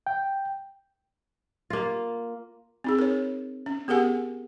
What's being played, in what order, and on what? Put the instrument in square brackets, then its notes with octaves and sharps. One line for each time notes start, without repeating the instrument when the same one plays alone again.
[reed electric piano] G5
[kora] A#3 F4
[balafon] C4 D#4 G#4
A#4 C#5
C#4
B3 G4 G#4 A#4 F#5 G#5